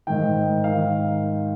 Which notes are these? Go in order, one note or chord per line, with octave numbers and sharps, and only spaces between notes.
G#2 D#3 G5
D#3 F5